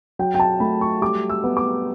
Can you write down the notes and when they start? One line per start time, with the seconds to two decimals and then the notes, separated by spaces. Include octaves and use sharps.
0.19 F#3 G5
0.35 G5
0.40 A5
0.60 A3 B5
0.81 C#6
1.01 G3 D6
1.29 E6
1.44 B3
1.57 D6